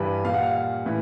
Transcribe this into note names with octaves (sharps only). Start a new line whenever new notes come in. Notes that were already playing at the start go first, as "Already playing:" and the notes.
Already playing: G2 E3 G3 B4
A#2 G3 F5 F#5
F5
F5
A2 E3